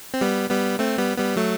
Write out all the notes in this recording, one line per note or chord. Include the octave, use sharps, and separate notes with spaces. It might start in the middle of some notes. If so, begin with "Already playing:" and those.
C4
G3 B3
G3 B3
A3 C4
G3 B3
G3 B3
F#3 A3